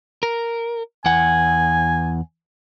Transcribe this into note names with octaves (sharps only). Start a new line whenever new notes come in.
A#4
E2 F#5 G#5